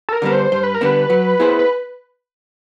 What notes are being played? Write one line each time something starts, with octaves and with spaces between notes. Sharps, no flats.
A4
A#4
D3 G3 B3 D4
C5
G2 C5
B4
A#4
D3 G3 B3 D4 B4
F#3
B3 E4 G#4 C5
B4